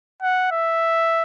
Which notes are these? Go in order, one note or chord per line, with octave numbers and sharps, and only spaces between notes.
F#5
E5